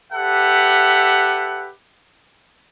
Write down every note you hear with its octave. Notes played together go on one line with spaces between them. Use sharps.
G4 A4 B4 E5 F#5